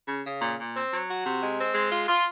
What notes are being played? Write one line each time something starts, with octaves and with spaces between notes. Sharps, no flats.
C#3
C#3
A#2
A#2
C4
F#3
F#4
C3
G#3
C4
G#3
F4
F4